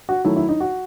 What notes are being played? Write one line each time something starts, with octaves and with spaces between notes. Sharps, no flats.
F#4
D#3 F#3 A3 E4
E4
D#4
F#4